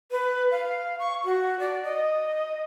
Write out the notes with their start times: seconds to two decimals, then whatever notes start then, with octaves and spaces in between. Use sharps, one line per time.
0.11 B4
0.51 F5
0.99 C#6
1.25 F#4
1.60 D5
1.84 D#5